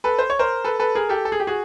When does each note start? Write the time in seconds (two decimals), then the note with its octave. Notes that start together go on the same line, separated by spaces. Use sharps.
0.04 A4 B4
0.19 C5
0.30 C#5
0.39 A#4 C5
0.65 A4 B4
0.80 A4 B4
0.95 G#4 A#4
1.09 G4 A4
1.25 A4
1.32 G#4
1.40 G4
1.47 F#4 G#4